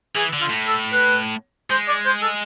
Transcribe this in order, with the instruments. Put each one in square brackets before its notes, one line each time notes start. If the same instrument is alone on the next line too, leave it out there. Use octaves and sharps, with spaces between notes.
[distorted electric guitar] E3 [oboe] G#4
[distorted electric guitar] D3
[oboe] F4
[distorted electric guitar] A2
[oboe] A4
B4
[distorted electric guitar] G#3 [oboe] C5
[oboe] D5
C5
A4